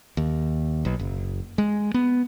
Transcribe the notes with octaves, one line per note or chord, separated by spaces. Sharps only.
D#2
B1
F#1
G#3
B3